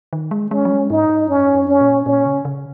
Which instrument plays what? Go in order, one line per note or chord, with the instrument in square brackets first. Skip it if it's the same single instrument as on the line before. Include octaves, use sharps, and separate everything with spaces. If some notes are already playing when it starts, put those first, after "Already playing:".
[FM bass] D#3
G#3
[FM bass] G#3 [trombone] C#4
[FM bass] F#3
G#3
[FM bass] G#2 [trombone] D#4
[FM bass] G#2
[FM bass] F#2 [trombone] C#4
[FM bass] F#2
[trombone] C#4
[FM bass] A#2
[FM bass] A#2 [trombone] C#4
[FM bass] C#3
C#3